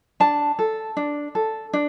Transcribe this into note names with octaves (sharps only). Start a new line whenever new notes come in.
D4 A5
A4
D4
A4
D4